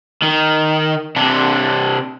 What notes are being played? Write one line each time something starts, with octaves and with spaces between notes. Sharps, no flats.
D#3
C3 D4